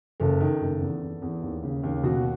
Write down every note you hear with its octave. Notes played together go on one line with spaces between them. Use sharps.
F#1 A4
D#3
F#1
E2
E2
E2
D#2
C#3
D#2
B2 F#4